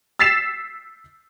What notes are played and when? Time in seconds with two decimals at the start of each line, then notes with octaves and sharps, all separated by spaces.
0.19 E6 A6 B6 C7 E7